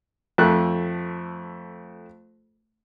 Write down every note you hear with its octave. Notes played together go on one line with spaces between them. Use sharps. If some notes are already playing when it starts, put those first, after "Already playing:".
F2 A3 F#6